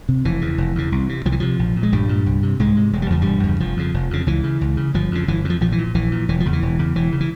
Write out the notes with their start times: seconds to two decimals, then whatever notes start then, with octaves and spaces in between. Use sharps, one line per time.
0.09 C3
0.25 F1 E3
0.41 E2 C#3
0.58 F1
0.75 E2 C#3
0.92 C2
1.09 C3
1.25 C2 F3
1.32 E3
1.40 C3 F3
1.59 A#1
1.76 A#2
1.83 G#3
1.92 A#1 G2 G3
2.09 A#2
2.26 C2
2.43 C3
2.60 C2 G#2 G#3
2.77 C3
2.93 E1 G#3
3.02 G3
3.10 E2 C#3 F3
3.22 E1 G2 G3
3.43 E2 C#3
3.60 F1 F3
3.77 F2 C#3
3.94 F1
4.10 F2 C#3
4.27 C#2 E3
4.44 C#3
4.61 C#2
4.77 C#3
4.94 G1 F3
5.11 F2 C#3
5.28 G1 E3
5.44 F2 C#3
5.50 F3
5.61 A#1 F3
5.72 E3
5.78 A#2
5.95 A#1 E3
6.12 A#2
6.28 E1 E3
6.40 F3
6.45 E2 C#3
6.53 E3
6.62 E1
6.79 E2 C#3
6.95 E1 E3
7.12 C#3
7.20 E3